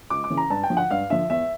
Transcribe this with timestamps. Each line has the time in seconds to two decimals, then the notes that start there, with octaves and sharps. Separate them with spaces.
0.10 C#2 D6
0.24 D6
0.30 C#3 E3
0.37 A#5
0.50 G2 A5
0.63 G5
0.70 D3 F3
0.77 F#5
0.90 G2 F5
1.10 D3 F3 E5
1.30 E2 E5